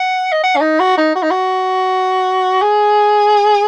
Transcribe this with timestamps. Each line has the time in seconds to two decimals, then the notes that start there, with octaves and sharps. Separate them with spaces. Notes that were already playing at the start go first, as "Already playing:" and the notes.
Already playing: F#5
0.32 D#5
0.43 F#5
0.56 C#4
0.61 D#4
0.80 F#4
0.97 D#4
1.15 F#4
1.23 D#4
1.31 F#4
2.62 G#4